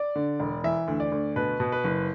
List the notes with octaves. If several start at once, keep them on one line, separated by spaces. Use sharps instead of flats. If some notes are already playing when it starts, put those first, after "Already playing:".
Already playing: D5
D3
E1
E3 E5
D2
D5
D2
B2 B4
B2
B4
F#1